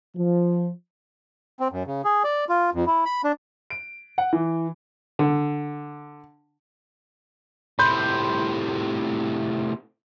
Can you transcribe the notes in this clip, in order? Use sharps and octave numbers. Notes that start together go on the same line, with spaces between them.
F3
C4
F#2
C#3
G#4
D5
F4
F2
E4
B5
D4
D7
F#5
E3
D3
A2 C3 B5 C6 G6